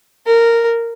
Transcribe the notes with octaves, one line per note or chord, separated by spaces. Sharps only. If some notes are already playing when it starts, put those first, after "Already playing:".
A#4